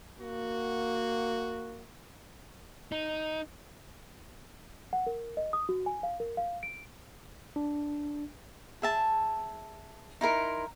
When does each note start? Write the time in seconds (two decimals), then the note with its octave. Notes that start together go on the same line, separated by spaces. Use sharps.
0.20 A#3 F#4
2.92 D#4
4.93 F#5
5.07 A#4
5.37 D#5
5.53 D#6
5.69 F#4
5.86 G#5
6.03 F5
6.20 A#4
6.37 F5
6.63 D7
7.56 D4
8.82 G#4 E5 A5
10.21 D#4 E4 A#4 C6